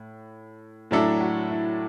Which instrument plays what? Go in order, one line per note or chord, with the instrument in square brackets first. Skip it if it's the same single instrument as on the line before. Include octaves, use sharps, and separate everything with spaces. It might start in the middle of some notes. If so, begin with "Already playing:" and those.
Already playing: [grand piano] A2
[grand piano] A2 F#3 D4 A4 E5 [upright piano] E4
[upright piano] F#4
E4